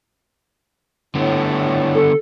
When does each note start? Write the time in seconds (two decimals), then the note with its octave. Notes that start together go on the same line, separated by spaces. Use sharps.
1.15 A2 D3 B3
1.94 A4